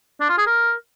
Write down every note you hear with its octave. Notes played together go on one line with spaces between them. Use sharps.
D4
F4
G#4
A#4